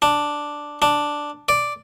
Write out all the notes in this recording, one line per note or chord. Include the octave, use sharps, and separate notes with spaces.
D4
D4
D5